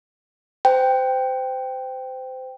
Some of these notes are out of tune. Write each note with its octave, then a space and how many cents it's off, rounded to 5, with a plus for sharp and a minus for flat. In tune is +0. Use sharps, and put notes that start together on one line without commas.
C5 -25 G5 +0